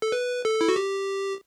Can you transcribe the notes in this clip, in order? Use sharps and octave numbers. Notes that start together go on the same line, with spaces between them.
A4
B4
A4
E4
F#4
G4